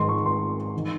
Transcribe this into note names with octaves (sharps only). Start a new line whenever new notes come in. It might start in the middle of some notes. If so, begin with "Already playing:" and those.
Already playing: G#2 D#3 C6
C#6
C6
D#3